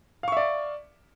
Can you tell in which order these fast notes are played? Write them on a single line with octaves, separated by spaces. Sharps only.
F5 C#6 E5 D5